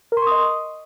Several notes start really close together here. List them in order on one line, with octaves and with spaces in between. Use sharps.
A#4 C6 C#6 D#6 D#5